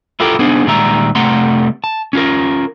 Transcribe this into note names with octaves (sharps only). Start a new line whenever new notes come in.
E4 F4 G4 A4 A#4
B3 D4 D#4 G#4 C5
A#2 D#3 G3 G#3 E5 A#5
C3 G3 A3 F#5 A#5 C6
A5
C#4 F4 A#4